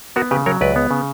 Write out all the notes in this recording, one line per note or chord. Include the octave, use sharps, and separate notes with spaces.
B3 F#4 A#4
C#3 G4 B4
F#3 A#4 C#5
C#2 B4 D5
B3
C#3